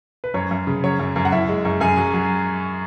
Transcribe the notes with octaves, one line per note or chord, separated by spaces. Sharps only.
B4
F#2 C#5
F#2
C#3
F#3 C#5
F#2
F#2
F#5
F#2 E4 E5
G#3
F#2
F#2 G#4 G#5
F#3
F#3